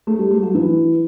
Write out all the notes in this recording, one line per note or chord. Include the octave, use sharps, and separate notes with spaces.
A3
G3
A3
F#3
E3